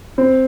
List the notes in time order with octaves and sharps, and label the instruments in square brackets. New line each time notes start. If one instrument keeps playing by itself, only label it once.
[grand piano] C4